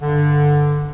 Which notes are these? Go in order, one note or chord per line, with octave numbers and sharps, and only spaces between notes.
G2 D3